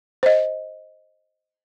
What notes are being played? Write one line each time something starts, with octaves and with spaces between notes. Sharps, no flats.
C5 D#5